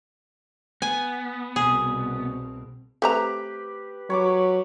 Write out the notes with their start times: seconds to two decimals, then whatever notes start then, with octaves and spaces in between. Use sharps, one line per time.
0.82 B3 G#5
1.56 C2 B2 C4 G#4
3.02 A3 C4 G4 B4 A#5
4.10 F#3 C#5 B5 D6